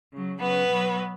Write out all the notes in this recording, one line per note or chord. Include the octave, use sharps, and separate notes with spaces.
C#3 F#3
C#3 F#3 B3 B4
B2 F#3